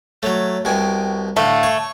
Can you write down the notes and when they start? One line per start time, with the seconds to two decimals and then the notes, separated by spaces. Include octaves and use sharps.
0.23 F#3 A3 C#5
0.65 C2 B2 G5 G#5
1.37 A2 D3 A3 F5
1.63 C#5 C#6